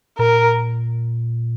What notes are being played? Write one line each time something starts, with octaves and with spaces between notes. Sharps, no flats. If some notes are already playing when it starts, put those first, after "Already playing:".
A#2 A#4